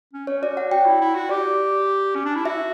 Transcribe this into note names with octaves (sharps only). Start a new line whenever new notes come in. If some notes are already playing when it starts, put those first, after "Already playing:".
C#4
C#4 C#5
F#4 D5
F#4 F#5
F#4 G5
E4
E4
F#4
G4 D5
C#4
D4
E4
F#4 E5